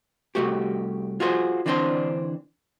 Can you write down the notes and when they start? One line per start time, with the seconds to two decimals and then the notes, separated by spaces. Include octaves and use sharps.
0.35 C2 A#2 A3 F#4 G4
1.20 F4 F#4 G#4 B4 C5
1.66 D3 E3 C4 D4 F#4 C5